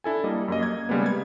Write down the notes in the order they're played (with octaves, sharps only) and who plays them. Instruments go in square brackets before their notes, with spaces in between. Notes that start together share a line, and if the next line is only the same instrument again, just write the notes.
[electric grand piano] D4 E4 A4 G#5
G3 A#3 D#5
F#2 A#3 D#5
G#6
C#3 G3 G#3 A#3 B3
G#6